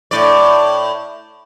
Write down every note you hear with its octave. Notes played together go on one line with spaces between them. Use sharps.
A2 D5